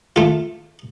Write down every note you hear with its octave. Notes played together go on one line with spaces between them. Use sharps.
A3 F4